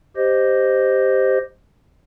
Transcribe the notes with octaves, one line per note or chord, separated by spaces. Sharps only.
G4 C5 D#5